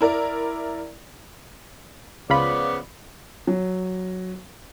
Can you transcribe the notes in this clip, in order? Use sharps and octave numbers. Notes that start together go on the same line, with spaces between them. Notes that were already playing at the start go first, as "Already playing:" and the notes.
E4 A#4 D5
C#2 C#3 F3 B3 F4 D5 B5
F#3